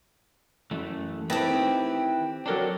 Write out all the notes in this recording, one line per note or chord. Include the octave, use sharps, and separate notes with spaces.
F#2 E3 A3
A3 C4 E4 G4 B4 D#5 A5
D#3
F#3 D4 A4 A#4 D5